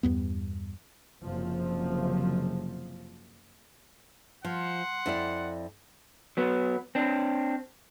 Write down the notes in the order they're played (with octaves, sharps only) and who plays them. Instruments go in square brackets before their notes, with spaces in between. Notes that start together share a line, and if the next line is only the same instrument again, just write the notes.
[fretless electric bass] E2 G2 B3
[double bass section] F#1 C3 F3
[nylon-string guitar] F3 [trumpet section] F#5 C6
[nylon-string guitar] F2 E4 D5
[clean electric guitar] F#3 B3
C4 D4